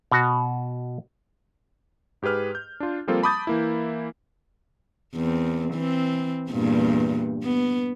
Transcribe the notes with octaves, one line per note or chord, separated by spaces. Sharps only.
B2 F#4
G#2 G4 G#4 B4 F6
G6
D4 F4
F3 G3 A#3 C4 F4 A4
A5 B5 D6 D#6 G6 A6
E3 A#3 E4
E2 C4
E3 C4
E2 G2 A#2
B3